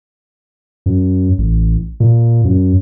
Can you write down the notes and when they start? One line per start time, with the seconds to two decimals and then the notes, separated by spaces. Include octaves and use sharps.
0.86 F#2
1.38 A1
2.00 A#2
2.45 F#2